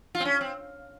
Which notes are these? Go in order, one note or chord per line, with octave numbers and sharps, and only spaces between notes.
F4
C4
C#4
C4